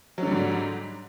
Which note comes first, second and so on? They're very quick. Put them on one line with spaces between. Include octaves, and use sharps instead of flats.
F#3 D3 G3 G#2